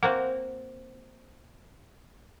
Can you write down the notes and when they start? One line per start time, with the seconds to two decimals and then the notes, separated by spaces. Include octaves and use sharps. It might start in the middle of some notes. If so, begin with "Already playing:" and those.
0.03 A#3 C4 F#4 F#5